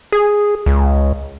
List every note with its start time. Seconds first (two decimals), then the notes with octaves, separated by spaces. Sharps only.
0.12 G#4
0.66 C#2